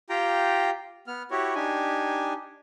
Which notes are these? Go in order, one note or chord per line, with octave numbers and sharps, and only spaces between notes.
F4 G4 G5 A#5
B3 F6
E4 F#4 G4 C#5
D4 D#4 G4 G#5